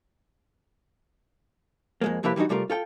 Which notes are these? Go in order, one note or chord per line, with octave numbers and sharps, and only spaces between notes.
F2 G#3 A#3
C2 F3 A#3 E4 G4 B4
E3 G3 C#4 D#4 F#4
C3 G3 A3 F4 A#4
F4 A4 G5